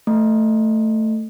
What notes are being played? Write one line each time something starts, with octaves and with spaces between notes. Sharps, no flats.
A3